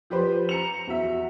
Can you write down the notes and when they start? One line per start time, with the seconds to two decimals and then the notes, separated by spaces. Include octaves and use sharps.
0.10 F3 G4 B4 C5
0.49 A#5 C#7 F7
0.87 E2 F#4 E5